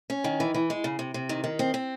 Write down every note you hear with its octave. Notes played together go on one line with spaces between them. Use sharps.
C#4
D#3
E3
E3
G#3
C#3
C3
C3
D#3
D#3
C4
C4